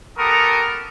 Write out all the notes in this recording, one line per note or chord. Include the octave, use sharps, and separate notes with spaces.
B3 G4 A4 A#4 C#6 D#6